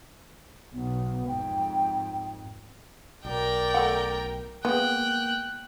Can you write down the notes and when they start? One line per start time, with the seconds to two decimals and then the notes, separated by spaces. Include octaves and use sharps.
0.74 B1 B3
1.28 F2 G#2 G5
3.25 B1 A#4 D5 G5
3.74 A3 F#5
4.65 G#3 A#3 B3 G5 F#6